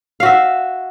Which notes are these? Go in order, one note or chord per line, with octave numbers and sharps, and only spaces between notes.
F#4 E5 F5